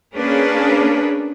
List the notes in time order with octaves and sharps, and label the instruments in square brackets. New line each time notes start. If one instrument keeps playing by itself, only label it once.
[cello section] A#3 C#4 D4 G#4 B4